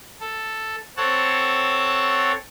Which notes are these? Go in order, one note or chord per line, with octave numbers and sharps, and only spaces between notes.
A4
C4 A4 C#5 F#5 A5